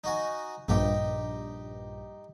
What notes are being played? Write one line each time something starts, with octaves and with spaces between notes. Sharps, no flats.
D#4 F#4 G#5
A#1 G2 D#4 G4